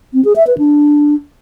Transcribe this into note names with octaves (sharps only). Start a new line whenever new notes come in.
C4
G#4
E5
B4
D4